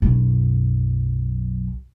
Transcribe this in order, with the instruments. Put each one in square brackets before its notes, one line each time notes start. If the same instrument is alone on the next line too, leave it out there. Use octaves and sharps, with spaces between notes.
[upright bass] B1 F#2